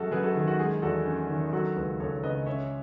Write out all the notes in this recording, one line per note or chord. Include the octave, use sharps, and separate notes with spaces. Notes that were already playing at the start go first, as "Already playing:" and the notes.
Already playing: F#2 G#3 F#4 G#4 A4
F#2 G#4 B4
F#4 A4
D#3 G#4
F#4
G#3 G#4
E2 F#4 A4
C#4
D#3
F#3 F#4 A4
C#2 G#4 B4
C#2 A4 C#5
C#3 B4 D#5
C#4 C#5 E5